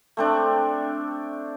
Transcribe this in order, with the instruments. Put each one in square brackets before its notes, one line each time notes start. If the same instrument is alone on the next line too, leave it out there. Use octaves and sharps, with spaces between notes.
[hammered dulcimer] A3 C4 D4